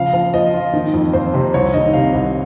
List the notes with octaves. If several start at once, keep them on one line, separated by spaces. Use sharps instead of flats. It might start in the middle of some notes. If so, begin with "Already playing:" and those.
Already playing: C#3 F3 F5
F3 F5
F3 D#5
F4
D#3
F2
F2 C5
C3
C2 C#5
D#3 D#5
C3 F5
C2